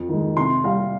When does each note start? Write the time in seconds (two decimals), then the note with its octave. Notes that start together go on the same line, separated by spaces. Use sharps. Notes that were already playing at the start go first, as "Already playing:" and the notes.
Already playing: F2
0.09 D#3 G#3
0.37 C3 C6
0.64 G3 F5